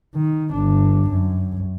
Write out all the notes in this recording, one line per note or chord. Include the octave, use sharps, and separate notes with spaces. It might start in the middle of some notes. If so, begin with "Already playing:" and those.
D#3
G1 D4
F#2